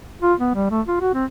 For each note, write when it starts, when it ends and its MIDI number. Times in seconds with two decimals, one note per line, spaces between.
0.22 0.34 65
0.40 0.53 59
0.55 0.68 55
0.71 0.81 57
0.87 0.99 65
1.01 1.12 66
1.14 1.25 60